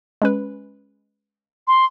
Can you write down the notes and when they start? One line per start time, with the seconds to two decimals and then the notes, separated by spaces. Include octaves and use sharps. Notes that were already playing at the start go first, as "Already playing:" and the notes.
0.22 G#3 C#4 B4
1.68 C6